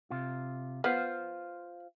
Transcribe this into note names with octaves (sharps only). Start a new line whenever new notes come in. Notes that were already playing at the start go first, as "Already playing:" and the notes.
C3 F4
B3 F4 C5 F5